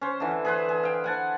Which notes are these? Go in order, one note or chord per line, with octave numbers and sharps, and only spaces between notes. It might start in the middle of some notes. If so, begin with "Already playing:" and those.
C#4 C5
D3 E3
G#4 B4 C5
G#4
F5 G5
F#5 G#5 A5